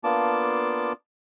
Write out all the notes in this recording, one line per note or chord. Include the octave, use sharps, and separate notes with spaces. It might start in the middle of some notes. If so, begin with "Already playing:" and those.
A#3 B3 D4 F4 A5 D6